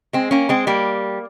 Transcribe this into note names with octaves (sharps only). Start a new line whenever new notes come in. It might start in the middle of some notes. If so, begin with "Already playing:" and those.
G#3 C4
A#3 C#4
G#3 C4
G3 A#3